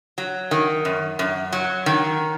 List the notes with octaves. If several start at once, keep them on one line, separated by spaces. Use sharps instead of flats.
F#3
D#3
F#2
F#2
F#3
D#3